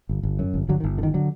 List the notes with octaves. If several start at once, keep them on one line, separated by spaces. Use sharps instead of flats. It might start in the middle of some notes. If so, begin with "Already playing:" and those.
G1
G1
F#2
G1
G1 D3 F#3
D#3
G1
D3
D#3
D3 F#3